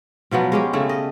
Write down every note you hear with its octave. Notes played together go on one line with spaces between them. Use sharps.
B2 F3 F#3 B3
G#3 C#4 G4
C#3 A3 E4
D#5